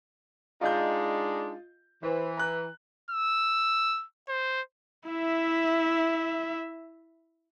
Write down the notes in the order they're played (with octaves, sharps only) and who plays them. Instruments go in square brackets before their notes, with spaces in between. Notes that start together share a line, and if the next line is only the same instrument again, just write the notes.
[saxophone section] G#3 D4 D#4 [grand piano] F4 D#5 G6
[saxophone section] E3 [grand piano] C5
[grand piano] A#5 F#6
[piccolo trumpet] E6
C5
[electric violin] E4 E5